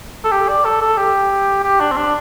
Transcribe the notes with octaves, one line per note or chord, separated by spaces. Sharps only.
A4
G4
D5
A4
A4
G4
G4
D4
C4
D4